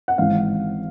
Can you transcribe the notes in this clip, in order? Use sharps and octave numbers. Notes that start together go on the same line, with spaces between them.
F#5
G#1 G#2 E3 F5